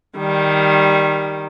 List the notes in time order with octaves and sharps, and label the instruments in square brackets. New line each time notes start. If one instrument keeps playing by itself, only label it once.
[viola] D#3 G3